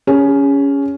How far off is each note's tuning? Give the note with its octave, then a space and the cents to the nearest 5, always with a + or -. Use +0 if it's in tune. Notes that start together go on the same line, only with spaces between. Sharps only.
C#4 +15 G#4 -35